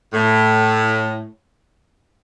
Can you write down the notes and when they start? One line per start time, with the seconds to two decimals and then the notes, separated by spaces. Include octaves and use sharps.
0.13 A2